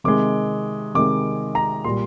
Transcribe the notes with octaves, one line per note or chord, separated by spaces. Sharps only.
C3 D#3 G#3 D6
C3 D#3 G#3 D6
A#5
A#2 G3 C6